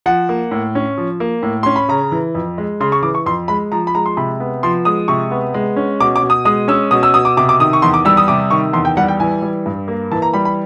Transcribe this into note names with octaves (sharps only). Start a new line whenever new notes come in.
F3 F#5
A#3
A2
C#4
F3
A#3
A2
C#4 C6
B5
C#3 A#5
E3
F2
G#3
C#3 C6
C#6
E3 D6
C#6
F2 C6
G#3 B5
F3 A#5
B5
G#3 A#5
C6
C3 B5
B3
F3 C6
G#3 D#6
C3 C#6
B3
G#3
C#4
B2 D6
D6
B2
D#6
G#3 D#6
C#4 E6
B2 D#6
E6
B2 D#6
D6
C3 D6
D6
D#3 D#6
C#6
E2 C6
D6
G3 E6
D#6
C3 D6
D#3 C#6
E2 C6
G5
G3 F#5
G5
E3 G#5
G3
G2
A#3
E3 A5
A#5
G3 B5
B5